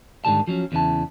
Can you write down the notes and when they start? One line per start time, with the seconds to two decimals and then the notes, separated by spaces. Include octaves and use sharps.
0.25 G#2 D3 D#3 G3 A5
0.47 F3 F#3 C#4
0.72 E2 C#3 E3 E4 A5